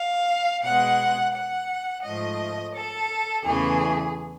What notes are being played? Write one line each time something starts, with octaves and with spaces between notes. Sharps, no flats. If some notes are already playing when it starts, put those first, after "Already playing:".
Already playing: F5
B2 G#3 F#5
F#5
G#2 F3 A3 D#5
A4
E2 C#3 E3 A3 G#4